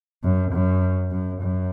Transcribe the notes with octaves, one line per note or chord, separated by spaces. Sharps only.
F#2
F#2
F#2
F#2